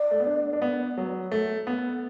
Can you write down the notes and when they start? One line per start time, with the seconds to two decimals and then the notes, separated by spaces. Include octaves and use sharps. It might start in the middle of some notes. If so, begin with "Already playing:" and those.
Already playing: D5
0.11 A3
0.20 B3
0.27 D4
0.53 D4
0.62 B3
0.98 F#3
1.32 A3
1.67 B3